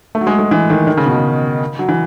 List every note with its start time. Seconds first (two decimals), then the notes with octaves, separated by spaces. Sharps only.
0.15 A3
0.21 F#3
0.27 G#3
0.39 G#3
0.51 E3
0.70 D#3
0.87 D#3
0.97 C#3
1.06 B2
1.15 C#3
1.79 F#3
1.89 E3